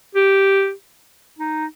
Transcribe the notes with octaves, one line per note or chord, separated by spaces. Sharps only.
G4
D#4